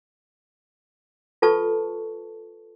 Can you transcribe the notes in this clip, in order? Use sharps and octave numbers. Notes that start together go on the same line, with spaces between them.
F4 A4 B4 A5 C#6